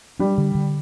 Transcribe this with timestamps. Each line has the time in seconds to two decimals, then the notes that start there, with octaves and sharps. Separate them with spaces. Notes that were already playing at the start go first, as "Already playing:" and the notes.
0.19 G3 D4
0.38 D3
0.55 D3